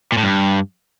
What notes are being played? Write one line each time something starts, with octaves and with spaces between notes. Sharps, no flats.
A#2
A2
G2